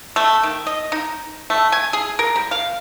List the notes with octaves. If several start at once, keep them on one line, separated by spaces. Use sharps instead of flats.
A3
D#3
D#5
D#4
A3
G#5
G#4
A#4
G3
F5